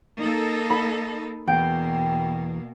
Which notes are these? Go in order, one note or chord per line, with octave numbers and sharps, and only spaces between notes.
A#3 D#4 A4
B5
E2 B2 A#3 G5